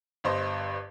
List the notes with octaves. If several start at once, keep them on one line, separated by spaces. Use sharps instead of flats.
G1 G2 C5 D#5